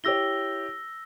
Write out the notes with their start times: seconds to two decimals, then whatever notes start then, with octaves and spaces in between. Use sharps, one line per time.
0.04 E4 G4 C#5 E6 A#6 G7